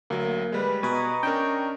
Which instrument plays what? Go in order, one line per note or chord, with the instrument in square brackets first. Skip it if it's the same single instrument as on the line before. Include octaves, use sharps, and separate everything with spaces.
[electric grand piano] D2 F#3 [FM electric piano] A#3
[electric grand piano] G3 G#3 [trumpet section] B4
[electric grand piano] B2 [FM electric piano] B4 G#5 [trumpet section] D#5 A#5 C#6
[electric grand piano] C#4 D4 A#4 [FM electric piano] G5